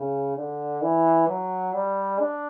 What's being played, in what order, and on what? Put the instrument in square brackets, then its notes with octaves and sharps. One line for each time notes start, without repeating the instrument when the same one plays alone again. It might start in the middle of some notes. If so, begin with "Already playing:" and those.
Already playing: [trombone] C#3
D3
E3
F#3
G3
D4